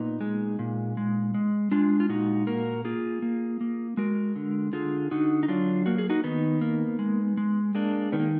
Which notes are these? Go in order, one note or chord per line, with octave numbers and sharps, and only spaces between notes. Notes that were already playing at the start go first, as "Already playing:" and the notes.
Already playing: A#2 B3 D#4
G#3
A#2
G#3
G#3
G#3 D4 F4
F4
A#2 D#4 F#4
A#3 F#4 A#4
A#3 F4 G#4
A#3
A#3
G#3 F#4 A#4
D3
D3 F4 G#4
D3 D#4 F#4
D#4
F#3 D4 F4
A#3 F#4
G#4
D#4 F#4
D#3 B3 D#4
A#3
G#3
G#3
G#3 A#3 D4
D#3 B3
A#3